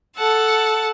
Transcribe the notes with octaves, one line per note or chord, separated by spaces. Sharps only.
A4 F#5 A5